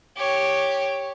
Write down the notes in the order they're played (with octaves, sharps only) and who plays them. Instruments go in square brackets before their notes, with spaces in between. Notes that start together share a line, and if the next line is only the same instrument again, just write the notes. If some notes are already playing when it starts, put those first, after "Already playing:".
[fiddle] G4 C#5